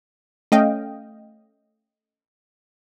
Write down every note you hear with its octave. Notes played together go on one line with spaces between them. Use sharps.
A3 C#4 D#5 F5 G5